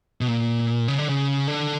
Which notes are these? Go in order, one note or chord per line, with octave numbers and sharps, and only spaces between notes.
B2
A#2
C#3
D3
C#3
D3